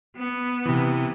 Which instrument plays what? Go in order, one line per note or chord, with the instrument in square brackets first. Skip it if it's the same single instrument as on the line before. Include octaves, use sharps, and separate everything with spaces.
[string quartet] B3
[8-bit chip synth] C3 E3